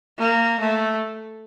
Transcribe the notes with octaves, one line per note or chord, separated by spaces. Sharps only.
A#3
A3